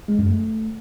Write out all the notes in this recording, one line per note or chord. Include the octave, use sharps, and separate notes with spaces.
G#3
F#2
A3